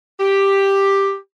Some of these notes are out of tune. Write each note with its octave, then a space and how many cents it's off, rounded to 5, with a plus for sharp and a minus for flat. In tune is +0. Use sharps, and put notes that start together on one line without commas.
G4 +5